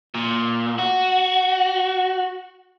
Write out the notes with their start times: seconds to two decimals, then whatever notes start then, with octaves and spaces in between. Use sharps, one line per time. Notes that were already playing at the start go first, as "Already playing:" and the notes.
0.15 A#2
0.79 F#4